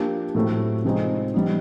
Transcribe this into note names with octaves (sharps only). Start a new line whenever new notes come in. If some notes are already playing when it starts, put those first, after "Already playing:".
Already playing: F3 A#3 D4 G4
A2 F#3 A3 C4
C3 F3 G#3 C4 D#4
G3 B3 D#4